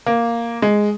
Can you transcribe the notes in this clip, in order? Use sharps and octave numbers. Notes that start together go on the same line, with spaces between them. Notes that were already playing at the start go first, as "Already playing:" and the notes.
A#3
G#3